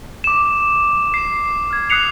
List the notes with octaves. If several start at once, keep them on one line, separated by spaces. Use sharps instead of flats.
D6 E7
C7 E7
F6 G#6
D#6 F#6 C7 C#7 F7